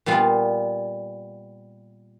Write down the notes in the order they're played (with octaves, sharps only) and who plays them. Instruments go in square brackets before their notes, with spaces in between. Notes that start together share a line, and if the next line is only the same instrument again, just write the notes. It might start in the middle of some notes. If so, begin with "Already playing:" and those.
[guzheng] A#2 G3 B3 F4